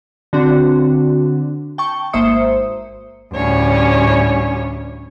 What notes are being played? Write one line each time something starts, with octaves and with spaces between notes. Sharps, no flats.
D3 C4 D4 F#4
G5 A5 C#6
G#1 A#3 C5 E5 D#6 C#7
D2 A2 G3 C#4 C#5